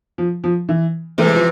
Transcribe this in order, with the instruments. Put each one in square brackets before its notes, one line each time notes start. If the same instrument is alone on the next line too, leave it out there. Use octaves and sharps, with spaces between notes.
[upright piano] F3
F3
E3
[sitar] C3 E3 [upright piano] A3
[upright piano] G#3
F3